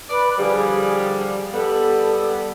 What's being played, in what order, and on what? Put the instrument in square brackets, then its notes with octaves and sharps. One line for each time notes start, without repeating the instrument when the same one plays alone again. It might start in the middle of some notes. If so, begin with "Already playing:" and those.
[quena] B4 [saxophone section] D5
[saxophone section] D3 F3 G3 [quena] G#4
[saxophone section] G3 B3 [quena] A4